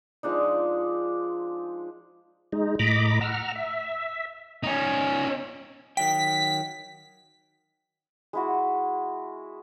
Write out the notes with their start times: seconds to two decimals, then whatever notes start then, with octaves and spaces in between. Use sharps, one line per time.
0.23 F3 G#3 D4 D#4
2.53 G#3 D#4
2.79 A2 D#5 A#5 B5 D6
3.21 F#5 A#5 E6 F6
3.55 E5
4.63 C#4 D#4
5.97 D#3 F#3 G5 B6
8.33 G#3 E4 F#4